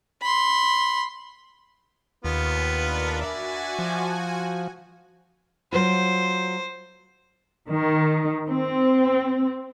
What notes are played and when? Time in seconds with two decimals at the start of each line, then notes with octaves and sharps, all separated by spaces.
0.22 B5 C6
2.25 D#2 B3 F4 B4
2.71 D4 A#4 B5
3.21 F#4 D5 E5 G#5
3.79 F3
5.72 F#3 F4 C5
7.68 D#3
8.48 C4